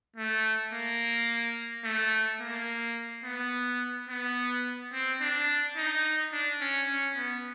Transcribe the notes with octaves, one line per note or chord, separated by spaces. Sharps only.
A3
A#3
A3
A#3
B3
B3
C4
D4
D#4
D4
C#4
C#4
B3